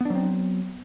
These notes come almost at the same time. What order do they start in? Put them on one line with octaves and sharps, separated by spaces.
B3 D4 F#3 C4